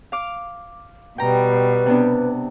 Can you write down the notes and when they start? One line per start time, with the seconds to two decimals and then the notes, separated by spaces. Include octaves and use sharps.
0.12 F5 D6 F6
1.18 B2 G3 B4 G5 A#5
1.86 C3 B3 D4